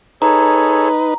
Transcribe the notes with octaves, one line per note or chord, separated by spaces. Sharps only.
D#4 G#4 A4 B4 C#5 A#5